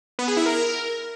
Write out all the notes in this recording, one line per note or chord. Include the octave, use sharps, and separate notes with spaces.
B3
G#4
E4
A#4